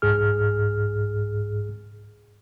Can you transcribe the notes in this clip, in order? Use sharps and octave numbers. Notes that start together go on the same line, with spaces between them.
C2 G#2 G#4 F6